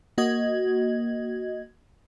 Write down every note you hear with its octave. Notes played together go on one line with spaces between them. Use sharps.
A#3 F#4 D#5 G#6